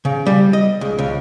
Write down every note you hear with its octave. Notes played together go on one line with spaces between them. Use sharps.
C#3
G3
D#5
C#2
C#2